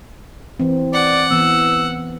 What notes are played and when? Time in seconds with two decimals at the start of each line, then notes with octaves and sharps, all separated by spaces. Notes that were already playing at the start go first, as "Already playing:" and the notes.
0.60 E3 C4
0.94 D5 F#5
1.31 E3 B3 E6